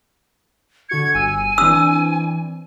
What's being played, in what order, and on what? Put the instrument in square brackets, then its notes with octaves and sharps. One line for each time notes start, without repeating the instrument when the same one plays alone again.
[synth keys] D3 F#4 C#7 [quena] G#6
[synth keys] G1 E6 D#7 [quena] G#5
[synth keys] E3 C4 D4 [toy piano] E6